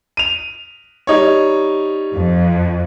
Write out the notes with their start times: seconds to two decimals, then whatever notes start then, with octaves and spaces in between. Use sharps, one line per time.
0.17 D#7 F7
1.07 G3 D#4 C#5
2.13 F2